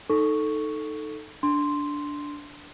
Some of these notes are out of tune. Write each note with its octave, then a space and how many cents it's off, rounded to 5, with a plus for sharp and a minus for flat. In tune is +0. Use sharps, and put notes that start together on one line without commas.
D#4 +0 A4 +0 C#6 +0
D4 -10 C6 +0